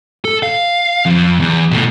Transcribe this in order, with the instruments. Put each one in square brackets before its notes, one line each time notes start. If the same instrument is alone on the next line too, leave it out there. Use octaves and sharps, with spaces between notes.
[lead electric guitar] A4
F5
F2
E2
B2 A3